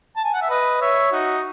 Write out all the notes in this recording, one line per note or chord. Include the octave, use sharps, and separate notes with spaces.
A5
G#5
F#5
E5
B4 D#5
C#5 E5
D#4 F#4